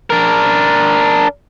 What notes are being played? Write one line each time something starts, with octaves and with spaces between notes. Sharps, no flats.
D4 A#4